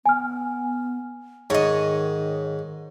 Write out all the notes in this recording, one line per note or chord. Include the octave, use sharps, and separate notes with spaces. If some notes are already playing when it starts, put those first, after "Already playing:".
B3 G#5 F6
G#2 D#3 C#5 D#5